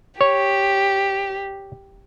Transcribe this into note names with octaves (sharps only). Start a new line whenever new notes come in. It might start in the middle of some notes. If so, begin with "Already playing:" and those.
G4 C#5